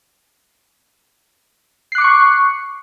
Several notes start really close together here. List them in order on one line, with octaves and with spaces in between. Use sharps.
C7 F#6 D6 C#7 C#6